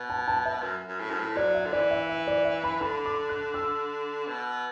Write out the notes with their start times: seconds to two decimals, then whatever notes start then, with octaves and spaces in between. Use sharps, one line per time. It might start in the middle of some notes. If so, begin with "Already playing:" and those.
Already playing: B2
0.10 A5
0.28 A5
0.46 E5
0.64 F#2
0.88 F#2
1.00 A2
1.10 F#2
1.20 A2
1.36 F#3 D5
1.55 E5
1.66 D3
1.73 E3 D5
1.91 E5
2.09 E5
2.27 D5
2.45 E5
2.64 B5
2.81 D3 B5
3.06 D6
3.29 F#6
3.54 E6
4.27 B2